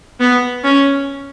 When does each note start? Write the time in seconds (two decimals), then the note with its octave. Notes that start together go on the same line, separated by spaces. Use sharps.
0.20 B3
0.64 C#4